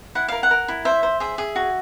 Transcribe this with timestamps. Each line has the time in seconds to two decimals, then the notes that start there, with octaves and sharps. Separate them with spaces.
0.15 E4 F#5
0.28 A#4 F5
0.43 F#5
0.51 A#4
0.68 E4
0.85 C5 E5
1.03 C5
1.20 G#4 E5
1.38 G#4
1.56 F#4